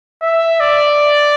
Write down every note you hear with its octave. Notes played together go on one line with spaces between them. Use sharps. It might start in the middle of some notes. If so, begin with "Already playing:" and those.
E5
D5